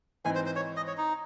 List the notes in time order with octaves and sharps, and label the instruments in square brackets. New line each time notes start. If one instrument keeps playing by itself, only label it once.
[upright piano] G#2 E3 C4 D#4 [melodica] G#5
[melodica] C5
C5
C#5
D#5
C#5
D#4